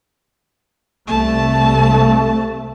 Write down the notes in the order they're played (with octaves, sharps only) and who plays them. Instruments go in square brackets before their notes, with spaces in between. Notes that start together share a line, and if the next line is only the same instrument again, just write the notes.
[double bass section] C2 A3 [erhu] A5